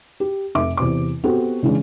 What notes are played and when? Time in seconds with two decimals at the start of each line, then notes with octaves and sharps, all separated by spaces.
0.20 G4
0.55 F1 E5 D6
0.77 E2 C3 D6
1.24 B3 C4 F#4 G4 A4 C5
1.63 C#3 E3 G#3 C#4 D4